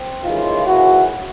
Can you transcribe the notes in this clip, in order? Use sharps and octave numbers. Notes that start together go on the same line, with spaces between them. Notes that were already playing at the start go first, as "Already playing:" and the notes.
Already playing: C4
D#2 C#3 E3 G#3 D#4 F4
D#2 C#3 E3 E4 F#4